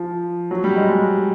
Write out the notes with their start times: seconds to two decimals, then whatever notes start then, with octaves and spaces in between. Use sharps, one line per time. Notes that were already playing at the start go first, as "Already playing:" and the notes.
Already playing: F3
0.51 F#3
0.64 G3
0.76 G#3
0.89 G#3